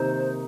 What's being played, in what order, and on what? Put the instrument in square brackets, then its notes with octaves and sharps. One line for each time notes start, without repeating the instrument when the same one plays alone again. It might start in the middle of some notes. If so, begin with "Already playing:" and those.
Already playing: [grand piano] C3 D#3 A#3 D#4 [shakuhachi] C5